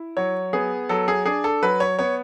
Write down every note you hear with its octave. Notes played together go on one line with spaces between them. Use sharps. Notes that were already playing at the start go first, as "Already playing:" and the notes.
Already playing: E4
F#3 C#5
B3 G#4
F#3 A4
G#4
D4 G#4
A4
F#3 B4
C#5
B3 C#5